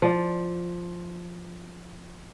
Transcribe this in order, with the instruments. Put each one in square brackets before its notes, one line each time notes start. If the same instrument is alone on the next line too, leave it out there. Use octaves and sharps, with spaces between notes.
[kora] F3 D5